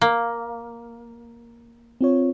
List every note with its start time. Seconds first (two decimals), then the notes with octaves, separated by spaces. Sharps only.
0.01 A#3
2.01 C4 F4 C#5